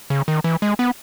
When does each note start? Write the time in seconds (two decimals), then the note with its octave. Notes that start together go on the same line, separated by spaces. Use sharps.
0.10 C#3
0.28 D#3
0.44 E3
0.62 G#3
0.79 B3